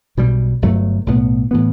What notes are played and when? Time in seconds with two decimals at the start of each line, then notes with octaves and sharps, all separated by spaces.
0.17 B1 B2 G3
0.62 G1 G2 F#3 A3
1.06 B1 A2 G3 B3
1.51 A2 E3 B3